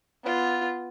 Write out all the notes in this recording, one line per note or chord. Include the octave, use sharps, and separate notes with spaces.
B3 F4